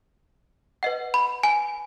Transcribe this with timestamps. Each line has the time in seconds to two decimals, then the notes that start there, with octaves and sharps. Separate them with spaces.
0.83 B4 D#5 F#5
1.14 B5
1.43 G#5